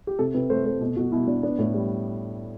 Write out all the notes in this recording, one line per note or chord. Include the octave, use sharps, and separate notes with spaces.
G4
C3 A4
C3 B4
A3 C5
A3 C5
B2
B2 F#4
B2 E4
B2 D4
B3 D4
A2
G3